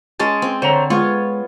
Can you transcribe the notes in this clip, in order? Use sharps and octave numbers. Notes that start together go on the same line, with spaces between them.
G#3 C#4 A5
C4
D3 C5 C#5 A#5
G#3 B3 F4 C#5